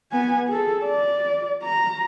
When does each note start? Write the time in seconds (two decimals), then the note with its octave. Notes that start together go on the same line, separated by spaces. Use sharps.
0.12 B3 G#5
0.48 G#4 A4
0.85 D5
1.63 A#5